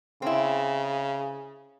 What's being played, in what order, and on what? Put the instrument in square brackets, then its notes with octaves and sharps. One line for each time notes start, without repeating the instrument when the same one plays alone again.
[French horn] C#3 [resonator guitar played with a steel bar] C4 E4